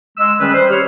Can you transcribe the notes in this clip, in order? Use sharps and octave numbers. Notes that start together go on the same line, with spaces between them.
G#3 E6
D#3 G3 C#4 G#4 B4
C5
G4 C#5 F6